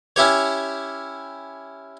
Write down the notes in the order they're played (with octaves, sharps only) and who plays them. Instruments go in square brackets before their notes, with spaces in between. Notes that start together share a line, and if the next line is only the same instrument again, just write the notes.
[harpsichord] C#4 E4 G4 C#5